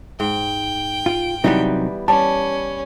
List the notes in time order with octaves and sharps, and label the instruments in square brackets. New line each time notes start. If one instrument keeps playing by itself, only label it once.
[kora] G#2 [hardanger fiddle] G5
[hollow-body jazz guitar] F4
[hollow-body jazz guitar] C3 F#3 D#4 [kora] E3 G3 B3
[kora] G3 [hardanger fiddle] C#4 [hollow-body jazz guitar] A5